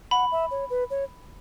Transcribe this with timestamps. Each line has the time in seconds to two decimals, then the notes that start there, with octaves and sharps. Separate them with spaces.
0.11 F#5 B5
0.32 E5
0.51 C#5
0.70 B4
0.90 C#5